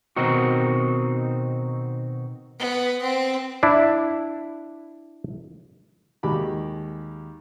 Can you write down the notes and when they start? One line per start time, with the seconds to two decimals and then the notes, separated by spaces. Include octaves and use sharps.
0.16 B2 D#3 C4 D#4 F#4
2.59 B3
3.02 C4
3.63 D4 E4
6.23 D#2 G#3 F#4 G4 B5 D6